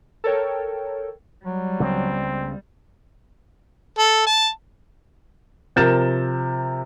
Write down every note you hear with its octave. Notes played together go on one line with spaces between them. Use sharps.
A4 A#4 C#5 G5
F#3 G3
C#2 C#3 B3 C4
A4
A5
C3 F3 A#4 G6 A6 E7